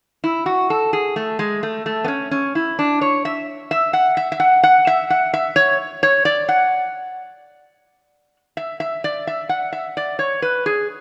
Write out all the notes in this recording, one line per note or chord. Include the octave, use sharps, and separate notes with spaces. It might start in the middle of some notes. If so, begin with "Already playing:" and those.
E4
F#4
A4
G#4
A3
G#3
A3
A3
B3
C#4
C#4
E4
D4
C#5
E5
E5
F#5
E5
E5
F#5
F#5
E5
F#5
E5
C#5
C#5
D5
F#5
E5
E5
D5
E5
F#5
E5
D5
C#5
B4
G#4